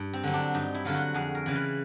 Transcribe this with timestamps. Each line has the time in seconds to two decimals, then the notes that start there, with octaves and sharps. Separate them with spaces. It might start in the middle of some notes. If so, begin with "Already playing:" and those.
Already playing: G2
0.13 C4
0.24 D3 F#3
0.34 D4
0.54 G2 D#4
0.74 E4
0.85 D3 F#3 F4
0.94 F#4
1.14 F2 G#4
1.35 A#4
1.46 C#3 E3
1.56 B4